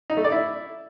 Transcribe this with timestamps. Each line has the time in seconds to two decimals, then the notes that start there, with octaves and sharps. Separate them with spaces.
0.10 D#4
0.17 A3
0.24 D5
0.32 E4